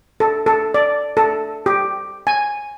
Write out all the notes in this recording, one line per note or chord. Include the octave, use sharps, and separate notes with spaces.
A4
A4
D5
A4
G4
G#5